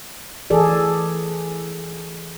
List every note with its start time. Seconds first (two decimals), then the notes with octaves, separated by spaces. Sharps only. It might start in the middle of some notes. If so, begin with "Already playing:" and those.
0.50 E3 G#4 A4 D5